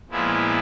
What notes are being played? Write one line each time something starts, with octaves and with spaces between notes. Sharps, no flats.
A#2 F3 G#3 B3 E4